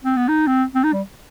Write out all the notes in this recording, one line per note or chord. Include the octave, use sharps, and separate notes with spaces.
C4
B3
D#4
C4
C4
D#4
G3